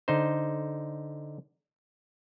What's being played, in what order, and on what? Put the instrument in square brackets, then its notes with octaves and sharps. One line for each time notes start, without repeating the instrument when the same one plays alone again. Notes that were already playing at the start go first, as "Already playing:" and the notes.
[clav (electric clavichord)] D3 D#4 C5